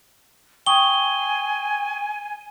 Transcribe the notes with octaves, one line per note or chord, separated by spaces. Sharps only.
G5 G#5 C#6 D#6 G7